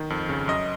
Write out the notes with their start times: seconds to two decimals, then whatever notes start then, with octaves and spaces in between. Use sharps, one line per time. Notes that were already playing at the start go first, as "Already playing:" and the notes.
Already playing: D#3
0.10 F2
0.29 C#3
0.48 F#2 D#5